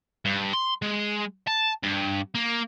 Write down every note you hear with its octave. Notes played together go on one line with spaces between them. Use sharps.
G2
C6
G#3
A5
G2
A#3